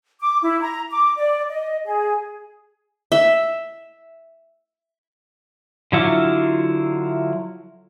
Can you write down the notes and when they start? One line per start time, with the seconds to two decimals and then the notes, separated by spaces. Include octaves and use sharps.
0.20 D6
0.42 E4
0.61 A#5
0.90 D6
1.17 D5
1.51 D#5
1.85 G#4
3.12 E5
5.92 D3 F#3 E4 F4 D6